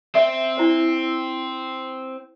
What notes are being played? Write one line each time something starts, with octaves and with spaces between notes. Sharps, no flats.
C4 E5
D4 E4 C5